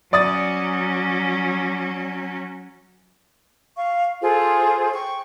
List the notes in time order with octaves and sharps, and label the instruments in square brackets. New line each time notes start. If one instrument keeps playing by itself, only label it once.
[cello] F#3 C#4 [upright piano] D5 D#6 A6
[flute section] F5 C#6
F4 G#4 A4 C5
G5 C#6